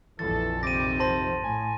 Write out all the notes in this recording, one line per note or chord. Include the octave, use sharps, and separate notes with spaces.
A#1 F2 E3 A4 A6
C3 D#3 C4 D6 A#6 D#7
C5 A5 C6 A#6
A2 G#5